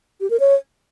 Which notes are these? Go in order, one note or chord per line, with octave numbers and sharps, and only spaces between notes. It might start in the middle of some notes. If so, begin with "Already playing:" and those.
G4
A#4
C#5